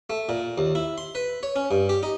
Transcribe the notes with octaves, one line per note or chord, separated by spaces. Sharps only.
A3
A#2
D#2
E4
C6
B4
C#5
C#4
G2
G4
D#4